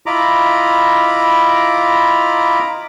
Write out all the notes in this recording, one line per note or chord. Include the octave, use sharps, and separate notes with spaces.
E4 F4 D#5 A#5 B5 D6